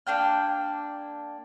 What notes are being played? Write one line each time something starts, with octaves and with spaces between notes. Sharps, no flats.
A#3 D4 G5 F6